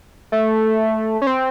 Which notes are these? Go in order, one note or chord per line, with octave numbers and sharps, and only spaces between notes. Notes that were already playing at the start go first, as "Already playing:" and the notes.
A3
C#4
C4